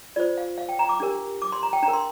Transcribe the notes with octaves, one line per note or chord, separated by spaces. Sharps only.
F4 C5 D5
F5
F5
G5
A#5
D6
D4 G4 A#4
D6
C6
A#5
G5
D4 A#5
A#4
C6